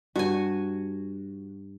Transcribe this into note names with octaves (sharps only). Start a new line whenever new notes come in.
G2 F#4 G#5